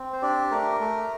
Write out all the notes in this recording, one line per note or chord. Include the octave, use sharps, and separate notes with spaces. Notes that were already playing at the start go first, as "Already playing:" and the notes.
Already playing: C4
C5
D4 G4 D5
A3 A#4
A3